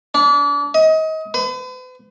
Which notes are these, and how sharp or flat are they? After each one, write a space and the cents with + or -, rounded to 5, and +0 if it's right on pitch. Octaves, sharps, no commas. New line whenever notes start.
D4 -35
D#5 +30
B4 +45